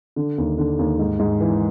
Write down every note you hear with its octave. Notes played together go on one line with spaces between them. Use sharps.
D3
D#2
D3
D#2
G#2
G#2
E3